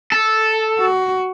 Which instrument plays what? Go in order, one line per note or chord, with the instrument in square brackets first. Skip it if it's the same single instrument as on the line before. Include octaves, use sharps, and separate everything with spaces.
[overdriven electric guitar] A4
[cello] F#4